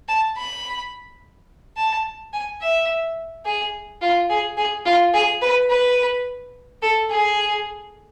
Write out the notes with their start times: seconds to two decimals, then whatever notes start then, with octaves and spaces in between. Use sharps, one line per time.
0.08 A5
0.37 B5
1.77 A5
2.33 G#5
2.62 E5
3.45 G#4
4.02 F4
4.30 G#4
4.57 G#4
4.85 F4
5.14 G#4
5.42 B4
5.70 B4
6.82 A4
7.10 G#4